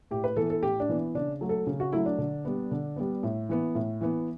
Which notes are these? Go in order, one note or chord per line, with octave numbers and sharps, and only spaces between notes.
A2 G4
B4
E3 B3 A4
A4
A2 G4
D4
E3 B3
C#3 D4
F#3 A3
A4
C#3
F#4
F#3 A3 E4
D4
D3
G3 B3
D3
G3 B3
A2
E3 B3
A2
E3 B3